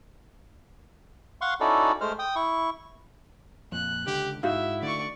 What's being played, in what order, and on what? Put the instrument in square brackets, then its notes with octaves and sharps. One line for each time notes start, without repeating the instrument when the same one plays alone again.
[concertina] F5 F#5 C6 C#6
C#4 D#4 E4 F#4 A4 D5
G#3 A3 C5 F6
G5 D#6
E4 C#6
[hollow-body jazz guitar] F2 A#2 [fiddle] F#6
[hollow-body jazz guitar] C#2 D3 [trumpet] G4
[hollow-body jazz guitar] G#2 [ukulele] D#4 F#4 F5 [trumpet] E4 [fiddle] E5
[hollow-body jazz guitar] D3 A3 [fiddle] D5 C#6